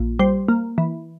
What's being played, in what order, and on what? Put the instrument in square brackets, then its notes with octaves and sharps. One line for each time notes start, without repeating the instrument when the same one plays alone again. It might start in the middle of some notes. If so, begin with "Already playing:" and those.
Already playing: [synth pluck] A#1
G3 C5
A#3
E3